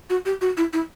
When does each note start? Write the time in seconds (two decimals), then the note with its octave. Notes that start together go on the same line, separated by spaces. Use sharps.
0.10 F#4
0.26 G4
0.41 F#4
0.57 E4
0.73 E4